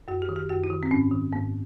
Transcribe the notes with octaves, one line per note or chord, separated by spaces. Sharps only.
F#2 F#4
G4
D#3
G4
F#2 F#4
E4
D#3
C4
G#2 C#4
D#3
G#2 B3